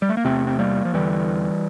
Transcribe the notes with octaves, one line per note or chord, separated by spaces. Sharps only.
G3
A3
A#3
E2 C3 A3 C4
C4
G3 A#3
F3
E2 D3 E3 G3